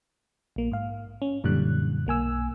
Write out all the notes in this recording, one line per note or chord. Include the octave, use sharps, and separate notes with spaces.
A#1 A#3
G#2 F5
C#4
F#2 A#2 D3 E3 G3 F#6
B1 A#3 G#5 E6